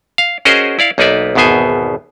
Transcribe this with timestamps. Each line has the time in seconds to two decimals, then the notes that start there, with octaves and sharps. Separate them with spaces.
0.18 F5
0.45 C#4 F#4 G#4 A#4 C5 D#5
0.79 E4 D5 F5
0.98 B1 A#3 D#4 B4 D5 E5
1.35 G#1 E2 B2 B3 C5 G#5